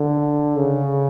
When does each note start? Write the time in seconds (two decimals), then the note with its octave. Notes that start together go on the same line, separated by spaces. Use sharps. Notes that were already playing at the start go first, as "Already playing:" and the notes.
Already playing: D3
0.57 C#3